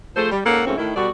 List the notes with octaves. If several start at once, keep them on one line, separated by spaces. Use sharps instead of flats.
F3 A3 G#4 A4 C5
G3
G#2 A#3 C#4 A4 F#5
F2 G#2 A3 A#3 C4 C#4
A2 D#3 E4
B2 G3 B3 F#4 A4 D5